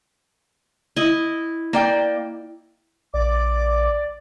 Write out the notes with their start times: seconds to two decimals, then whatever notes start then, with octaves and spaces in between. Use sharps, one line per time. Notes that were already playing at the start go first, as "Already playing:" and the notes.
0.96 E4 D#5
1.73 A#3 D5 G5
3.14 A#1 D5 D6